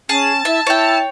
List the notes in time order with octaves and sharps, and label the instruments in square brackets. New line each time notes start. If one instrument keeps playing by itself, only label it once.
[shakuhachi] C#4 [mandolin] G#4 [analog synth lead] A5
[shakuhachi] E4 [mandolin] E5
[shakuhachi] E4 [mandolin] C#5 G5